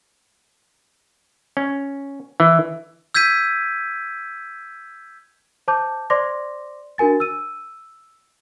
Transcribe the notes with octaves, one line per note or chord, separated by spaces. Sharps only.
C#4
E3
E6 G6 G#6 B6 D#7
C5 A5 D6 G6
C5 D5 C6 D6 A#6
D4 F#4 A#4 G#5 A6
E6 D#7